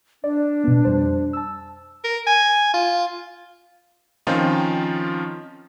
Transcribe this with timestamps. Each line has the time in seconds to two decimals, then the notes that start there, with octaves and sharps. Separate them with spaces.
0.24 D4 D5
0.64 B2 B3
0.85 F2 G3 C5
1.33 A5 E6
2.04 A#4
2.26 G#5
2.73 F4
4.27 D#3 F3 C4 C#4 D#4 F4